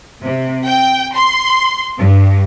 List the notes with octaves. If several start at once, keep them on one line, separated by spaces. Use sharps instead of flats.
C3
G5
C6
G2